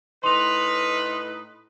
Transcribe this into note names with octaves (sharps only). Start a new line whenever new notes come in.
A2 D#4 B4 C6 F7